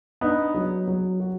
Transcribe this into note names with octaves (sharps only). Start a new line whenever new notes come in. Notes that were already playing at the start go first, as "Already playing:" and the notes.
B3 D4 D#4
F#3
F#3
F#4